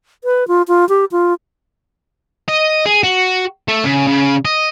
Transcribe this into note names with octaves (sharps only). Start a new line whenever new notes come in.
B4
F4
F4
G4
F4
D#5
G#4
F#4
A3
C#3
C#3
D#5